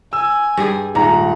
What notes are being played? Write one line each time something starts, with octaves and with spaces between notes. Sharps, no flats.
G#5 E6
G2 G3 G#4
D#1 G#2 F#5 A#5